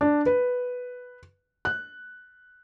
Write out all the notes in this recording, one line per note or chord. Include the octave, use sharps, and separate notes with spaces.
D4
B4
F#6